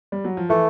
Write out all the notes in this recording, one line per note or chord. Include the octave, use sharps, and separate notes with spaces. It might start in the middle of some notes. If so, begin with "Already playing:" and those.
G3
F#3
F3
E3 A3